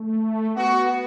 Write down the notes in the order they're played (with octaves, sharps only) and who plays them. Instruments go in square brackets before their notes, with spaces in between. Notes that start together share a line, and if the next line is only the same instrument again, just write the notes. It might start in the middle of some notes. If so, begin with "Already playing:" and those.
Already playing: [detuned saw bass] A3
[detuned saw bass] B3 [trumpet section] F#4